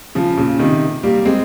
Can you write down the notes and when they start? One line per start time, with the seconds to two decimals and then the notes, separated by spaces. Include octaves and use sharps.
0.15 C#3 F3
0.37 A#2 C#3
0.59 C3 D#3
1.03 G3 A#3
1.25 G#3 C4